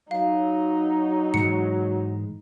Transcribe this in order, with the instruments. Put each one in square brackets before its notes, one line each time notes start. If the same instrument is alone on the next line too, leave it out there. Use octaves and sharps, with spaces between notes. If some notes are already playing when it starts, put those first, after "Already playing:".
[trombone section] F#3 [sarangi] D#4 [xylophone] F5
[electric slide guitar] G#2 E3 G#3 [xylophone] C#7